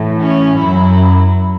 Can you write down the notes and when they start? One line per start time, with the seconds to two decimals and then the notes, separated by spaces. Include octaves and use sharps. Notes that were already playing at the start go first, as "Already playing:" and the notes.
Already playing: A2 E3
0.21 C#4
0.58 F#2 F#3 E4